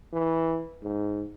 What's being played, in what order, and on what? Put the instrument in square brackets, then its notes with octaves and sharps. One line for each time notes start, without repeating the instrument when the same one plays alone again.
[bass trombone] E3
G#2